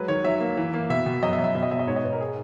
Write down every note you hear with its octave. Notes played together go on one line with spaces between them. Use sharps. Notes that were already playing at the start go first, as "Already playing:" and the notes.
Already playing: F#3 G#3 B4
D#3 C#5
F#3 E5
A#3
E3
A#3
B2 E5
B2
F#2 D#5
E5
F#2
E5
B2 E5
D#5
B2 E5
D#5
G#2 C#5
D#5
G#2 B4
A#4
G#4